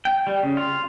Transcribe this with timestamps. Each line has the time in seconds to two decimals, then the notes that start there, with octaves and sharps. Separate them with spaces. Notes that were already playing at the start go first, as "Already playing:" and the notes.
0.05 G5
0.27 G3
0.43 C#3
0.57 F4